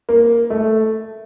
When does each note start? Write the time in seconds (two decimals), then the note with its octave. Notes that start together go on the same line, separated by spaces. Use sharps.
0.09 A#3
0.50 A3